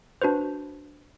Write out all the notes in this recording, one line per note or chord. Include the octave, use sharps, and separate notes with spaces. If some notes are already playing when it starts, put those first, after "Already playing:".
D4 F#4 B4 C5